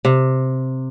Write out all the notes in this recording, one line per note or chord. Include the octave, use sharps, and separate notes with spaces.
C3